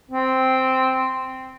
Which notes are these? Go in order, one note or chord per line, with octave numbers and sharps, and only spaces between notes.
C4